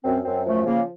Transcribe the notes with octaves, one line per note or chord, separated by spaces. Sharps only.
F#2 C4
F#2 C4
F3 A3
C#3 A#3